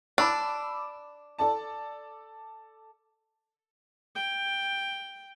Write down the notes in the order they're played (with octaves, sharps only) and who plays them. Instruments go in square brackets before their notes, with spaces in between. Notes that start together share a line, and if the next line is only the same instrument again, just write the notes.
[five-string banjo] D4 [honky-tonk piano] B5 D6 E6
[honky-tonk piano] A4 D5 A5
[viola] G5